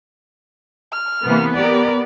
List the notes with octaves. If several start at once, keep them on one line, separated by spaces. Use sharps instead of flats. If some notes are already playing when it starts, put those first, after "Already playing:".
F6
C3 E3 A#3 B3
G4 A#4 D5